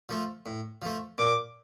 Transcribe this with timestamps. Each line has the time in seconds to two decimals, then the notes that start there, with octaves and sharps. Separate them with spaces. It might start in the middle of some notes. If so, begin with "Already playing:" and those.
0.09 F3 A3
0.46 A2
0.82 F3 A3
1.18 A#2 D6